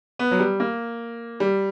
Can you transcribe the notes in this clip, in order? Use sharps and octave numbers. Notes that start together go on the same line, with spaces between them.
B3
F#3
G3
A#3
G3